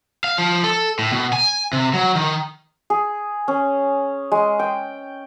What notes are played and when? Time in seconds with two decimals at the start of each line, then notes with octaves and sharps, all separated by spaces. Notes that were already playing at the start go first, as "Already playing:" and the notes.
0.24 F5
0.38 F3
0.64 A4
0.99 A2
1.12 B2
1.33 G#5
1.73 C3
1.93 F#3
2.15 D#3
2.90 G#4
3.48 C#4
4.32 G#3
4.59 G5